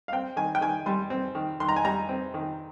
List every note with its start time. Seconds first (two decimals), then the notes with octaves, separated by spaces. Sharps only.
0.08 F5
0.13 C4 G5
0.36 D#3 G#5
0.55 G5
0.61 D#3 G#5
0.86 G3 C6
1.10 C4
1.35 D#3
1.60 D#3 C6
1.69 A#5
1.76 G#5
1.84 G3 A#5
2.09 C4
2.34 D#3